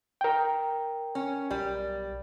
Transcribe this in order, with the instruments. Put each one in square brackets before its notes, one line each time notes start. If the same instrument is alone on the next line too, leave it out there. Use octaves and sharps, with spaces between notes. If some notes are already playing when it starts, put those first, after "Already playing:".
[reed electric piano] A#4 G5
[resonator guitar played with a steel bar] C#4
[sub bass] B1 [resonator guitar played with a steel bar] G3